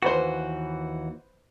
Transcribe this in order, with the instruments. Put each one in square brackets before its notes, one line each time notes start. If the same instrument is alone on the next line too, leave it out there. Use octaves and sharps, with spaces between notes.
[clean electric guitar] D#2 E3 F#4 [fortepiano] B4 C5